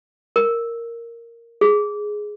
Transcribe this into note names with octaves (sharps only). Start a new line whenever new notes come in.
A#4
G#4